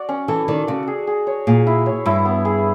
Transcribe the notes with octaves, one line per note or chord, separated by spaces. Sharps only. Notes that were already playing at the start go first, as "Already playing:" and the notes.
Already playing: F#4 D5
C#4
E3 A4
D#3 D5
C#3 F#4
G#4
G#4
C#5
A#2 G#4
E4
C#5
G2 E4
B3
G#4